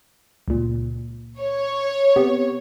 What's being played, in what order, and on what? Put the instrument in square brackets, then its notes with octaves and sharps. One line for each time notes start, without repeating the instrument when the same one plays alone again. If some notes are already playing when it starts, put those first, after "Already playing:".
[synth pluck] C#2 A#2
[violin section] C#5
[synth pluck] C3 B3 G4